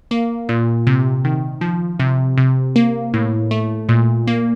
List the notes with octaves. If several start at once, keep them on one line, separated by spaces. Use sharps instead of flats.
A#3
A#2
C3
D#3
F3
C3
C3
A#3
A2
A3
A#2
A#3